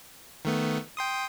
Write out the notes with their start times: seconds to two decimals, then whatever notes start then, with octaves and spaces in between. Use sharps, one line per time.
0.45 D#3 A3 B3
0.97 G5 C6 D#6